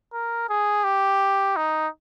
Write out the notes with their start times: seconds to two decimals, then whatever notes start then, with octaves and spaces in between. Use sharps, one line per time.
0.13 A#4
0.49 G#4
0.84 G4
1.56 D#4